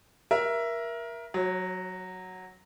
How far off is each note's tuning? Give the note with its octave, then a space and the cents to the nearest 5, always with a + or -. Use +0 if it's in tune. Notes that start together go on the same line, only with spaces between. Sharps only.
A#4 +20 E5 +15
F#3 +0 C#5 -40